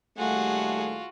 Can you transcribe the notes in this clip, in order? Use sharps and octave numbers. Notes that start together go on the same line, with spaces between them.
D#2 G3 A3 F4 F#4 G#4 F#5